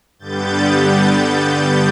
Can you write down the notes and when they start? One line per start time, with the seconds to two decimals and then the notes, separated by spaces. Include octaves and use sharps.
0.19 G2 D3 G3 B3 G6 A6
1.18 G6 A6